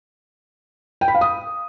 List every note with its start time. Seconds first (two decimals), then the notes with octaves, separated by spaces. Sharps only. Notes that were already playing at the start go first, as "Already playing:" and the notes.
1.01 G5
1.08 B5
1.15 F5
1.21 D#6